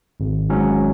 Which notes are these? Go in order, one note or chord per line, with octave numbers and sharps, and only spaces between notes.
G#1
G#2 F#3 C#4